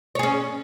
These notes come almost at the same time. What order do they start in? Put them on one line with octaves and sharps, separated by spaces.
C#5 G#4 C#4